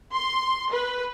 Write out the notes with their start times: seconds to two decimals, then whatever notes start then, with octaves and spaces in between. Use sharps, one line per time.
0.13 C6
0.71 B4